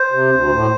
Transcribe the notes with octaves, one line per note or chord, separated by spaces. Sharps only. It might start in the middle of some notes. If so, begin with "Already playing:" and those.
Already playing: C5
C3
D2
A2